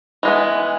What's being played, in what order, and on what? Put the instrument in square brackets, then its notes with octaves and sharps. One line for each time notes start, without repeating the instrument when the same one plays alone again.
[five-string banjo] E3 G#3 B3